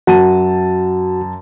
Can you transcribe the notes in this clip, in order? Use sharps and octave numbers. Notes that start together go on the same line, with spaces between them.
F#2 F#4 A5 D#7